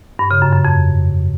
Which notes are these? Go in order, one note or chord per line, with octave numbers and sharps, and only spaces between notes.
G2
C#3
F#2
F#2
F2